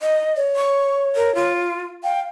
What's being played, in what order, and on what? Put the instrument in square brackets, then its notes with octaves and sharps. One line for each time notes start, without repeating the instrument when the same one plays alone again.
[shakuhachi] D#5
[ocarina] C#5
[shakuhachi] C#6
A#4
F4
[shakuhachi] F5 [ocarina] G5